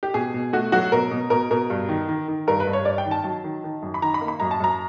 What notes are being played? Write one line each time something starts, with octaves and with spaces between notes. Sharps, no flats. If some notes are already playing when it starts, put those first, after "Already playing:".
G4
B2 G#4
B2
A3 F#4
F#3 F#4
B2 A#4
B2
B2 A#4
B2 A#4
G2
D#3
D#3
D#3
G2 A#4
B4
G2
C#5
G2 D5
G5
D#3
A5
F#3 A5
D#3
D#3
F#2
B5
D#3 A#5
B5
A#3
B5
F#2 A#5
A5
F#2 A#5